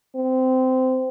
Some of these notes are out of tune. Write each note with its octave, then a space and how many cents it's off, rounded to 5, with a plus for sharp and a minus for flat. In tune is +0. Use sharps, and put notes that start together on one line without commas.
C4 -20